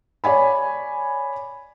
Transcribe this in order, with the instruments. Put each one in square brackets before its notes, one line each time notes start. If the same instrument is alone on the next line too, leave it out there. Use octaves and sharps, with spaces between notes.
[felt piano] C#5 D5 G#5 B5